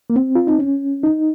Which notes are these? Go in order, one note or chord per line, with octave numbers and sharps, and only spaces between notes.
A#3
C4
F4
D#4
C#4
D#4